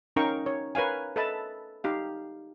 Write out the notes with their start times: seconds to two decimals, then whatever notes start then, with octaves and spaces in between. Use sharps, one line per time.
0.16 C#4 D#4 A#4 F5 G5 C#6
0.46 C#5
0.75 A#4 B4 C#5 F5 G#5
1.16 A4 B4 D#5 E5 A5 B5
1.84 D#4 G4 F5